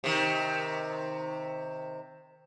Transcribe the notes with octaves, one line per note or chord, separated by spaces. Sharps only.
C3 D#3